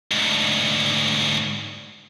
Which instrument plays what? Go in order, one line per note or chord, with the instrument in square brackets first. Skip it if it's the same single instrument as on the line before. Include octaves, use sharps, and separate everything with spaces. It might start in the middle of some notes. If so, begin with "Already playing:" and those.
[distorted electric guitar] D2 G#2